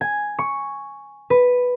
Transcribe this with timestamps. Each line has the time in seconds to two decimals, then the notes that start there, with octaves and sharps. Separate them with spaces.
0.01 G#5
0.39 C#6
1.30 B4